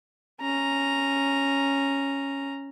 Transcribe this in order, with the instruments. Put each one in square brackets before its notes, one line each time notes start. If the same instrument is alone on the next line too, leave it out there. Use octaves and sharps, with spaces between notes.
[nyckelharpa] C#4 A#5